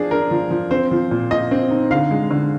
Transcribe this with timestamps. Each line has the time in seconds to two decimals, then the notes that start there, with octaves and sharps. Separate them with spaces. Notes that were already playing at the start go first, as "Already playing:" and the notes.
Already playing: F3 D4 G#4
0.11 D4 A#4
0.31 F3
0.51 F3
0.71 C4 C5
0.91 F3
1.11 A#2
1.31 A#2 D#5
1.51 C4
1.71 D#4
1.91 D3 F5
2.11 G#3
2.31 D3